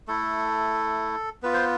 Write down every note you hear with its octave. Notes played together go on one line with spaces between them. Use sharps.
A3 E4 A4
B3 F4 B4
C5